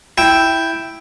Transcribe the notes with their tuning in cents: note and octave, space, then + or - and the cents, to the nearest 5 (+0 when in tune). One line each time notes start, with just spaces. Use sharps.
E4 +0 G5 +0